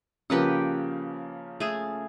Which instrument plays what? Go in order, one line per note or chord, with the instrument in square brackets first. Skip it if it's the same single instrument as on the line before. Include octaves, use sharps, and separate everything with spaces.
[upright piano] C#3 F3 A#3 [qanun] G4 B4 F#5
[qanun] A3 G#4